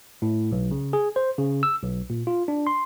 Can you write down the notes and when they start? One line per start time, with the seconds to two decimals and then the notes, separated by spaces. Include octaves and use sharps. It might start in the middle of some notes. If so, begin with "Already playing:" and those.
0.22 A2
0.52 B1
0.71 C#3
0.93 G#4
1.16 C5
1.38 C#3
1.63 E6
1.82 B1
2.10 A#2
2.27 F4
2.48 D4
2.67 C6